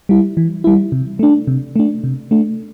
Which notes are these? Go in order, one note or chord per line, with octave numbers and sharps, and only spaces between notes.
G3 E4
E3
G3 E4
C3
A3 D4
C3
A3 D4
C3
A3 D4